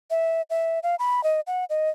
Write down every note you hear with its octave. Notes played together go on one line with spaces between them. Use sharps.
E5
E5
F5
B5
D#5
F#5
D#5